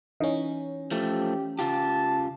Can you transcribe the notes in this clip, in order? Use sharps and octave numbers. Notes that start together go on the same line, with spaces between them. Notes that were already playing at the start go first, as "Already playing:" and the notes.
E3 C#4 D#4
F3 A3 G4
C#3 F4 G4 A5